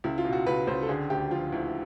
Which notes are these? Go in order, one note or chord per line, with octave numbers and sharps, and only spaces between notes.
C#2 E4
F4
B2
F#4
C#2 B4
C#2 C5
A4
D3 G#4
D2 G4
F3 F4
D2 E4